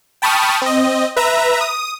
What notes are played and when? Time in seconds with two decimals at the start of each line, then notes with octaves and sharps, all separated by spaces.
0.22 G5 A5 B5 C#6 D#6 F6
0.62 C4 D#5
1.16 B4 E5 A#5
1.61 D#6